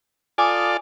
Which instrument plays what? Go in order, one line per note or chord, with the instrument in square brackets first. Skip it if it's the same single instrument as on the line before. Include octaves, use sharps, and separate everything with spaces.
[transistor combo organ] F4 A4 D5 [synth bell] G#5 D6 D#6